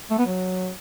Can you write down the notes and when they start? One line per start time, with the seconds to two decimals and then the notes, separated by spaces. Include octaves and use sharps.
0.11 A3
0.19 B3
0.26 F#3